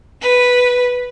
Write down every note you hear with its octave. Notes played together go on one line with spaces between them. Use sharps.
B4